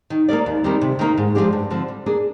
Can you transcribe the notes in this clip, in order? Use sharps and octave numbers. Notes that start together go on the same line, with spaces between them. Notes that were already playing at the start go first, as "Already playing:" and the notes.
D#3
A#3 D#4 A#4 D5
D#2
D#3 G3 C4
C3
D#3 A#3 D#4
G#2
F3 G#3 D4 G4
G2
D3 F3 C4
G3
A#3 D4 G#4